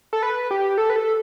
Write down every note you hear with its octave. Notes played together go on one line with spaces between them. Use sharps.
A4
B4
G4
A4
B4
A4